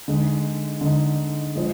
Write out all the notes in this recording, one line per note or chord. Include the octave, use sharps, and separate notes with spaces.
D3 G#3 D#4
D3 G#3 D#4
F3 G#3